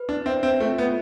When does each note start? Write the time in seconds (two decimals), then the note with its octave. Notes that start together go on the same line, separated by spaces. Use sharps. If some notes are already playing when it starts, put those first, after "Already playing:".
Already playing: B4
0.09 D4
0.26 C4 E5
0.43 C4
0.60 A3 F4
0.78 B3